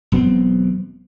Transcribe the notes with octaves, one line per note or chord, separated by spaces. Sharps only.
E1 F#3 B3 C4